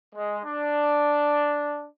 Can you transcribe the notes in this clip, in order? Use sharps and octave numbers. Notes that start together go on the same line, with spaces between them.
G#3
D4